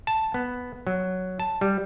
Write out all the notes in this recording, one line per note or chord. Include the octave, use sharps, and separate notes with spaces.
A5
B3
F#3
A5
G3